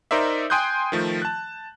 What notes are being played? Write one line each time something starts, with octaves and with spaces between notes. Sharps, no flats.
D#4 A#4 C5 D5 E5
G5 G#5 C6 D#6 F#6 G6
D#3 F3 A3
A5 F#6